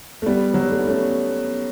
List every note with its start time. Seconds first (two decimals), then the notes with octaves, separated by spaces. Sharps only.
0.22 A3
0.26 G3 B3
0.54 F#3
0.62 G3
0.71 A3
0.79 B3
0.87 A3 C#4